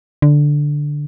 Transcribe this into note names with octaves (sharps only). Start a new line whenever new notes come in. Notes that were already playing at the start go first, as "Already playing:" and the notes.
D3